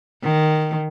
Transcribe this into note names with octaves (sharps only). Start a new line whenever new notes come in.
D#3